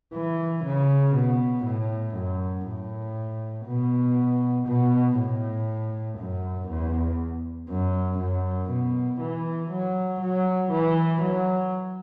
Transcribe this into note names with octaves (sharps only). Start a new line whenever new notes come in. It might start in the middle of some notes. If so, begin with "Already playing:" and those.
E3
C#3
B2
A2
F#2
A2
B2
B2
A2
F#2
E2
F#2
F#2
B2
E3
F#3
F#3
E3
F#3